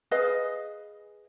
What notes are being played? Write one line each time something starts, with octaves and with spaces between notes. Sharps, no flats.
G#4 B4 D#5 F5